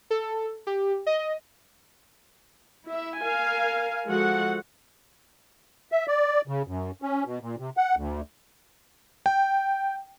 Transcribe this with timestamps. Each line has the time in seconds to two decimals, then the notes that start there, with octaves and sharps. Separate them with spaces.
0.11 A4
0.67 G4
1.07 D#5
2.87 E4 E5
3.21 A#4 F5 G#5
4.07 F3 G#3 F#4 A4 F#5
5.92 E5
6.08 D5
6.48 C#3
6.67 F#2
7.02 C#4
7.25 B2
7.42 A#2
7.58 C3
7.77 F#5
7.96 D2
9.26 G5